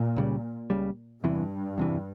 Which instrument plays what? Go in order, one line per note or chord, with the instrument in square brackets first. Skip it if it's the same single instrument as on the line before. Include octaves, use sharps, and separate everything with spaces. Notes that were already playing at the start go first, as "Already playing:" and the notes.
Already playing: [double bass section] A#2
[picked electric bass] C#2 C#3 G3
C#2 C#3 G3
[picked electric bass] E2 C3 E3 [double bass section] G2
[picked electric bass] E2 C3 E3